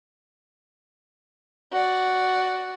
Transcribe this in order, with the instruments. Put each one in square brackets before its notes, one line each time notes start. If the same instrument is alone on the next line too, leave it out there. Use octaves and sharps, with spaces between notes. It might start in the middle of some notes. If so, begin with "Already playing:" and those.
[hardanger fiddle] F#4 D5